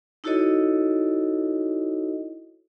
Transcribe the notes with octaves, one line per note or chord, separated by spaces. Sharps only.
D#4 E4 F#4 A4 C#5 D#5